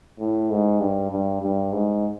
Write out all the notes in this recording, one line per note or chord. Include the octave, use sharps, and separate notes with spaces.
A2
G#2
G2
G2
G2
G#2